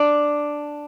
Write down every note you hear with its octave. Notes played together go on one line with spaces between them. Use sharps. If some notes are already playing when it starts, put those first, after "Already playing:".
Already playing: D4